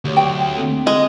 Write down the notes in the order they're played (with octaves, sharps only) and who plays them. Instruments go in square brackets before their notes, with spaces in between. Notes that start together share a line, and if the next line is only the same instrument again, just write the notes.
[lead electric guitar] D2 [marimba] G4 C#5
[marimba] F#3 [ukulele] G5
[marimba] A#3 C4 A4
[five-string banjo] G#3 [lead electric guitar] D#5